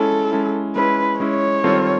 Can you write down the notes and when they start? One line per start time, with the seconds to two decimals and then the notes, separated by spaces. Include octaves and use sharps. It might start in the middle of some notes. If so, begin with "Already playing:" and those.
Already playing: G#3 C#4 E4 A4
0.31 G#3 C#4 E4
0.76 G#3 C#4 E4 B4
1.20 G#3 C#4 E4 C#5
1.64 D#3 G3 C4 F4 A4